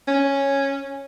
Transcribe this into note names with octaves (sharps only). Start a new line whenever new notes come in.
C#4